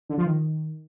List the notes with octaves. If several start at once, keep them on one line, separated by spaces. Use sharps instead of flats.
D3
F3
D#3